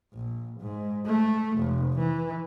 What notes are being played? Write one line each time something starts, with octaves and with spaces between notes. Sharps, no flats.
A#1
G#2
A3
F1
E3